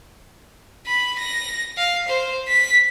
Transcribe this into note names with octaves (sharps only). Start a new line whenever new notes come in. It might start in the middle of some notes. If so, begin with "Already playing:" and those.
B5
A#6
F5
C5
B6